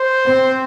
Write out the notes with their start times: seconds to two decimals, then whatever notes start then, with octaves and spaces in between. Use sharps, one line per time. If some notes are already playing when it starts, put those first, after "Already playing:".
Already playing: C5
0.26 C4